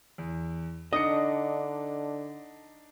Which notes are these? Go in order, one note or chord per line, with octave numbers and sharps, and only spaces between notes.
E2
D3 D4 D#4 D#5 C#7